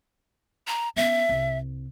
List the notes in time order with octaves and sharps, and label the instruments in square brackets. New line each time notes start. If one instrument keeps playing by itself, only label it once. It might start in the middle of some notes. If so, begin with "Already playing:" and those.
[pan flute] A#5
[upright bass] B3 C#4 [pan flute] E5
[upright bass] C2